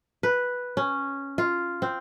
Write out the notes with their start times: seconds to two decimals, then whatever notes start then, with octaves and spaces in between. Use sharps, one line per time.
0.23 B4
0.77 C#4
1.38 F4
1.82 C4